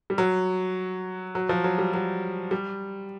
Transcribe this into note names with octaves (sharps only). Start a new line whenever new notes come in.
G3
F#3
F#3
F3
F#3
G3
F#3
G3